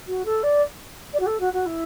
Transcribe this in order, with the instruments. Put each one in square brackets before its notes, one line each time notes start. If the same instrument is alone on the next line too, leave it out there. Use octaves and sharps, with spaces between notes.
[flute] F#4
A4
D5
D5
F#4
A4
F#4
F#4
E4